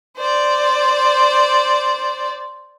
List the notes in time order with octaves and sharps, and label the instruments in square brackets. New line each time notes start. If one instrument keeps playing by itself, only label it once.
[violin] C5 D5